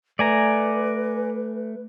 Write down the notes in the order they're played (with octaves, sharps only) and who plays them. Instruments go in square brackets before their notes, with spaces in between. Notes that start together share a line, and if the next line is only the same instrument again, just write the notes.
[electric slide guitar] A3 [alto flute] B4 [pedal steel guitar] D5 G#5 A#5